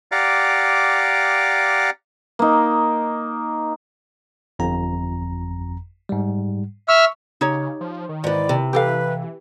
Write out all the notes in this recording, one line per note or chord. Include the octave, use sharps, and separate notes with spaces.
G4 D5 F5 F#5 A#5 D6
A#3 D#4
G1 F2 A#5
G#2 G3
E5 C#6 E6 F6
C#3 D#4 G4 C#5
F3
D#3
G#2 E3 D5
C3
E3 G4 A4 B4 F5